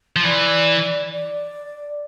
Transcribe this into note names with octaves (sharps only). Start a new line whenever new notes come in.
F3
E3 D5
D5